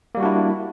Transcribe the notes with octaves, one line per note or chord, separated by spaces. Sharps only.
G3 A#3 D4 E4 F#4